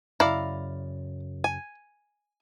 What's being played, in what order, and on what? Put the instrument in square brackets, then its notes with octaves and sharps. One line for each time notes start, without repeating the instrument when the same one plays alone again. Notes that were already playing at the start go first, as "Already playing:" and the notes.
[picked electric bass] F#2 C#3 [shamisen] E4 [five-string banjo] D5 F5 A#5
[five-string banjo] G#5